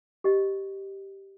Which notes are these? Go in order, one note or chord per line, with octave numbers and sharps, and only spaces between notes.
G4 D#5